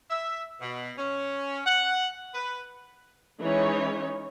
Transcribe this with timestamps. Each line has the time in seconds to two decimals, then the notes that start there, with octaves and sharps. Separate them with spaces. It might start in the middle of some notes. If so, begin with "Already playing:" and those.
0.10 E5
0.61 B2
0.98 C#4
1.66 F#5
2.34 B4
3.42 E3 G#3 C#4 D#4 C#5